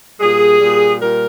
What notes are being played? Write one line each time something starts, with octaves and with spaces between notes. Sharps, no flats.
A#2 G3 G#4
A#2 G3
A#2 G3 A#4